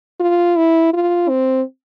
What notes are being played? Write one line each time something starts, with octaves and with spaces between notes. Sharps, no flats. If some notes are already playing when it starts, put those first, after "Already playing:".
F4
E4
F4
C4